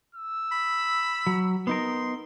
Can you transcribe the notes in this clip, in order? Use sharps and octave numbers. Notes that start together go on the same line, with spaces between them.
E6
B5
F#3
B3 D#4 A#4 C6